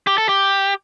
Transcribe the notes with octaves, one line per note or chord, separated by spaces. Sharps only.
G4
A4
G4